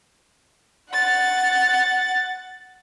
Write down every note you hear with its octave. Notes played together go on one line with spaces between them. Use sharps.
F#5 A6